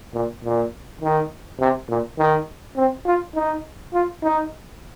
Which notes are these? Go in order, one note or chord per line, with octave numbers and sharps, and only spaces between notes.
A#2
A#2
D#3
C3
A#2
D#3
C4
F4
D#4
F4
D#4